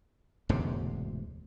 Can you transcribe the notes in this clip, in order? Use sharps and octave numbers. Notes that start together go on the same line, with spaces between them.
E1 D2 G#2 C3